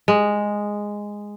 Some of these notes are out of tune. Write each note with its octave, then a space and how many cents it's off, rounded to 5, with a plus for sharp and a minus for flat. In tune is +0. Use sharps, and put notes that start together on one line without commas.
G#3 -5